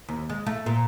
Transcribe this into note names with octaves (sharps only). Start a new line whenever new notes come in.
D#2
G#3
A3
A#2